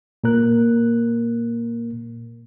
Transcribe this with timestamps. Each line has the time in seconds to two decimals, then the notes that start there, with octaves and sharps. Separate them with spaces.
0.24 A#2 A#3 A#4 F#6